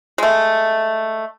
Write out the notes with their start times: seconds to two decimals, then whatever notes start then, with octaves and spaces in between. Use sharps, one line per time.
0.18 G#3 A3